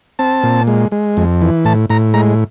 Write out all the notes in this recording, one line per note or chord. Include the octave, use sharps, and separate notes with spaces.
C4 A5
A#2
G#3
G#3
F2
E3
A2 A5
A2 A#5
G#3 A#5